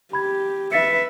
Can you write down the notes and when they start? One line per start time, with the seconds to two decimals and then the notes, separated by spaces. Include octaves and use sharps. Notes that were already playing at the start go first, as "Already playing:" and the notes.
0.13 G4 B5 G#6
0.72 B4 E5 A6 B6 C#7